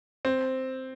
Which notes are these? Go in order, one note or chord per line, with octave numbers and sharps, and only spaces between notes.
C4